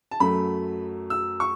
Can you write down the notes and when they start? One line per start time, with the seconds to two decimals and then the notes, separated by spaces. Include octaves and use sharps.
0.11 A5
0.20 F#2 F#3 A3 B5
1.10 E6
1.40 C#6